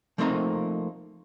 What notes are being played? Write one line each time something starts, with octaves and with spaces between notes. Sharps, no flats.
F3 A3 A#3 C4 D#4 A#5